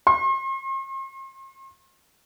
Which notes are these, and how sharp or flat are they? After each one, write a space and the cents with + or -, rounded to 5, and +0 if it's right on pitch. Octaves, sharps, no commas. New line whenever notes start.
C6 +45